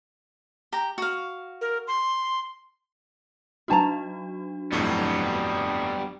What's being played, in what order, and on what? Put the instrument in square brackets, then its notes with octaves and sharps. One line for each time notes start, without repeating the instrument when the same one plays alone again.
[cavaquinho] G4 A#5
F#4 F5
[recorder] A#4
C6
[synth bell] F#3 D4 F#4 [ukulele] D#4 A5 A#5
[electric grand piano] G1 F2 A2 [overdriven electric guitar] G3 B3